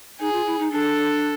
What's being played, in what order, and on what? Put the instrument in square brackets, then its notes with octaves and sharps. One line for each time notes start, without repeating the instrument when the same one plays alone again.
[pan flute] D#4 [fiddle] G#4
[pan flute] F4
E4
D#4
[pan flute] D4 [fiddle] A4